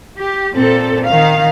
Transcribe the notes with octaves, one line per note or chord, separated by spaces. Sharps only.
G4
A#2 C4 A4
D#3 F5